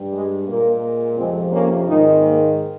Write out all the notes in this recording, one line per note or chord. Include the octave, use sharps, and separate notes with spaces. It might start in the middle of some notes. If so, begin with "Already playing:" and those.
Already playing: G2 G3
G#3
A#2 G#3 A#3
F2 C3 F3 G#3 C4
A#3 C#4
G#2 D#3 G#3 C4 D#4
A#3